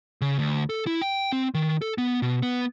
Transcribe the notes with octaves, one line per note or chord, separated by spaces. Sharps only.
C#3
D2
A4
E4
G5
C4
D#3
A4
B3
B2
B3